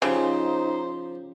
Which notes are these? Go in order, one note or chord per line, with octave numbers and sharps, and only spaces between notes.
C#3 F3 D#4 G4 C5